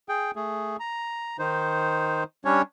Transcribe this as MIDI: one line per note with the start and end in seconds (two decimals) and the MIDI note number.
0.09 0.31 68
0.09 0.31 79
0.36 0.76 57
0.36 0.76 68
0.80 1.37 82
1.39 2.24 51
1.39 2.24 63
1.39 2.24 72
2.45 2.62 55
2.45 2.62 61
2.45 2.62 62
2.45 2.62 73